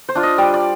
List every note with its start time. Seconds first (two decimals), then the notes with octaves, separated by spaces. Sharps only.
0.09 C5
0.15 D4 F4
0.23 D#5
0.38 G3 D5
0.54 D5